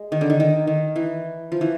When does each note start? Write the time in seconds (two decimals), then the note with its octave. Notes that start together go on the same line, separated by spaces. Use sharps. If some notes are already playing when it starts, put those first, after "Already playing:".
Already playing: G#3
0.12 D#3
0.21 D3
0.30 D#3
0.40 D#3
0.67 D#3
0.96 E3
1.52 F3
1.61 E3